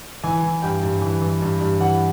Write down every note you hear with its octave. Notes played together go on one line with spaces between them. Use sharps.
E3 G#5
E3
G2 G5
G2
E3
E3
G2
G2
E3 F#5